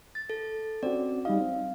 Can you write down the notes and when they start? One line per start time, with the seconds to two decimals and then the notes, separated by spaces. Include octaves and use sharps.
0.15 A6
0.30 A4
0.83 C4 C#4 F#4 D5
1.25 G3 D#4 D#5 F5
1.41 C4